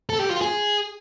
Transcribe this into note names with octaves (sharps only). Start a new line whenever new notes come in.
A4
G4
F4
G#4